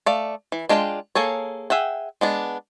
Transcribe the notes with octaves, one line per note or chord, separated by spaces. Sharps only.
A3 D5 F5
E3
G#3 D4 F4 A4 G5
A#3 G#4 A4 C#5
G#4 E5 F#5 G5
G#3 B3 D4